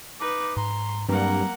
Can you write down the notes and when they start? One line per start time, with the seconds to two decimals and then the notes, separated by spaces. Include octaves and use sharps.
0.20 D#4 B4 D6
0.57 G#2 A#5 C6
1.08 G2 F#3 G3 A#3 C4 F#5 A#5